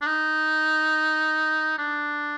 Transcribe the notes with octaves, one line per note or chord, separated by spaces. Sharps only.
D4
D#4
D4